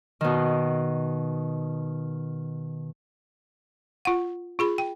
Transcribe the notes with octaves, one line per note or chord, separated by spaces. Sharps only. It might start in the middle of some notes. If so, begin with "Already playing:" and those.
B2 D#3
F4 F#5
F4 G#4 B5
G5